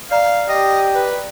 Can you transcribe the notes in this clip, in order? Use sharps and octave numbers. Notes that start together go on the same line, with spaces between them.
D5 F5 A#5
G4 D#5
B4